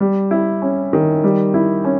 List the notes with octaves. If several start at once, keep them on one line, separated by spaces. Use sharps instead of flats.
G3
E4
C#4
D#3
G3
E4
C#4